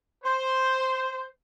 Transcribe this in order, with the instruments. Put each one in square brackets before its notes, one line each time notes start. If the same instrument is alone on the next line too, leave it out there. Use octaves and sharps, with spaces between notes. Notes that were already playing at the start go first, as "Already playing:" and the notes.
[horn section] C5